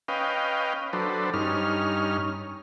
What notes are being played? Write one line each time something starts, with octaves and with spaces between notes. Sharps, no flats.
C#4 B4 D#5 F5 G5
F#3 D4 A4 B4 C5
G2 C#4 D#4 F6